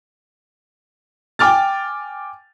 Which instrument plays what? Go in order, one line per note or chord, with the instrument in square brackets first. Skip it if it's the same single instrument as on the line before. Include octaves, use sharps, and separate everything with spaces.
[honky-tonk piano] G5 G#5 D6 F6 A6